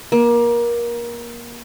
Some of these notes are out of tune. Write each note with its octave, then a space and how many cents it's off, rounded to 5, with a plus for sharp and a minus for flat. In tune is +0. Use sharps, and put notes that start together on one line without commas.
A#3 +25